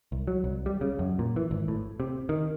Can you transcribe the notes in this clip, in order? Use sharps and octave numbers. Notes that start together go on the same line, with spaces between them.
C2
F#3
C2
G3
C#3
F#2
A#2
E3
G#1
A2
C3
D#3